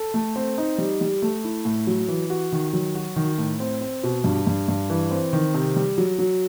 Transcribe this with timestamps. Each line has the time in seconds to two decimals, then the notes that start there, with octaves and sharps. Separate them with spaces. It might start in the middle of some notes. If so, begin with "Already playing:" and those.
Already playing: A4
0.14 A3
0.36 C4
0.58 D#4
0.78 G3
1.01 G3
1.22 A3
1.44 E4
1.65 A2
1.87 F#3
2.08 E3
2.30 F#4
2.52 D#3
2.73 F#3
2.95 F#4
3.16 D#3
3.38 A2
3.60 C4
3.81 C4
4.03 B2
4.24 G2
4.47 G2
4.68 G2
4.90 E3
5.11 C4
5.33 D#3
5.54 C3
5.76 G3
5.98 F#3
6.19 F#3